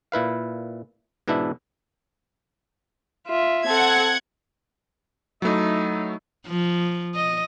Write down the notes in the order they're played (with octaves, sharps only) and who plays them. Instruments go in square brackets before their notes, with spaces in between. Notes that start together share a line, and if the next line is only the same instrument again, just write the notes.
[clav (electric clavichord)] A#2 E4 B4 F5
G#2 B2 E3 D4 E4 E5
[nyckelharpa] F4 E5
[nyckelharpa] C4 [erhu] A4 [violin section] F#5 G#6
[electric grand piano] F#3 A3 [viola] D#4 E4
[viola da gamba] F3
D#5